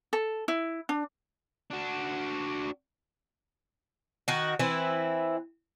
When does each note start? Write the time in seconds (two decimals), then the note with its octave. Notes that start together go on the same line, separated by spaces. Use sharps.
0.13 A4
0.48 E4
0.89 D4
1.70 D4 F#4
4.28 D#3 F#4
4.59 E3 C4 E4